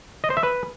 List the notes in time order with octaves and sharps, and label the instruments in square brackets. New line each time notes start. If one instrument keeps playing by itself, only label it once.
[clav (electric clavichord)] D#5
C5
E5
B4